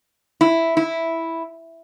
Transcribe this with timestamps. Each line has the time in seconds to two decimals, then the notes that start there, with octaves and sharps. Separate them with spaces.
0.41 E4
0.77 E4